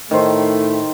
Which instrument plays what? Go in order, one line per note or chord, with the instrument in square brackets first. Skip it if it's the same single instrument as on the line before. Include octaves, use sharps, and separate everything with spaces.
[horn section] A2 A3 [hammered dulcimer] D#3 C5